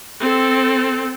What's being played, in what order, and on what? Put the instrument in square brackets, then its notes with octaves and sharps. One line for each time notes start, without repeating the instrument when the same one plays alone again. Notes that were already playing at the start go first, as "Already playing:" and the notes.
[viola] C4 A4